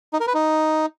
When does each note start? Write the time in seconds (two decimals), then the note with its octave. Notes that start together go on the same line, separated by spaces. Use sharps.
0.13 D#4
0.20 A#4
0.27 B4
0.34 D#4